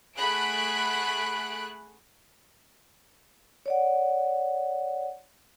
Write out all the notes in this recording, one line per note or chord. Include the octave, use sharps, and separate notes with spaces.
A3 G#4 F#5 B5 F#6 D7
C#5 D5 F#5